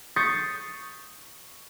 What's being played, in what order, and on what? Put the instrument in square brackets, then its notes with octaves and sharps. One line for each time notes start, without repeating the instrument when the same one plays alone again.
[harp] C#6 D#6 G6 A6 B6 C7